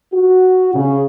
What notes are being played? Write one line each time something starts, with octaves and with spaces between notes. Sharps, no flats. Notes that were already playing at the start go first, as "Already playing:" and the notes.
F#4
C#3